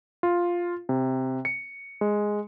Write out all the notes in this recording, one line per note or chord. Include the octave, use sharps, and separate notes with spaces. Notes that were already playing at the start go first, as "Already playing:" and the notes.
F4
C3
C#7
G#3